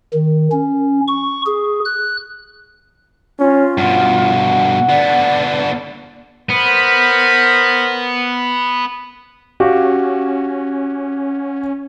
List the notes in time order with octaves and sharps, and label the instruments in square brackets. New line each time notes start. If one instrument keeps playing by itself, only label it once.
[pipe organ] D#3
C#4
C#6
G#4
F#6
[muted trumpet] C#4 [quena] F4
[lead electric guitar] G2 B2 [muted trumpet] F#5
[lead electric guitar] D3 B3 [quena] D5
[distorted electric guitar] B3 [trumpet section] A#4 C5 B5
[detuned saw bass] C#4 [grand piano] F#4 G4 F5